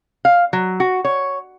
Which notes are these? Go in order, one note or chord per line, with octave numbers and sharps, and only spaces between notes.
F5
F#3
F#4
C#5